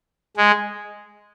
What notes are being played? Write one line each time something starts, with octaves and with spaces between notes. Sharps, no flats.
G#3